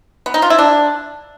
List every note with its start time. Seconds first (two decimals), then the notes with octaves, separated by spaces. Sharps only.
0.26 B3
0.34 D#4
0.42 F4
0.50 E4
0.58 D4